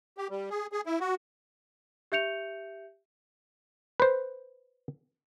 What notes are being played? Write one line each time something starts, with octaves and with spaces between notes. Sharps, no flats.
G4
G3
G#4
G#4
E4
F#4
G4 E5 G6 C#7 F7
B4 C5